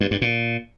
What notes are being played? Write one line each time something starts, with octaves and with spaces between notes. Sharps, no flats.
G2
G2
A#2